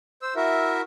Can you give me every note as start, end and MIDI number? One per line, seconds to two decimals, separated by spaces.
0.22 0.34 72
0.22 0.34 88
0.36 0.81 64
0.36 0.81 66
0.36 0.81 70
0.36 0.81 76